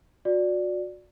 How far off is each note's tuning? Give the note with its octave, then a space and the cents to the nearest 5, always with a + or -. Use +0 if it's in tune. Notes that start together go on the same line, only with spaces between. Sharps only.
F#4 -30 D5 +0